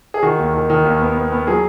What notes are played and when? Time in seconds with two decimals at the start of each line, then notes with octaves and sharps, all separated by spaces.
0.14 G#4
0.23 D#3 F#4
0.39 D#2
0.54 D#3
0.70 D#3
0.85 D#2
1.01 B3
1.16 B3
1.32 B3
1.47 F#3 G#4